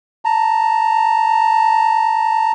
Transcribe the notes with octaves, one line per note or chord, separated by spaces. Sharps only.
A5 A#5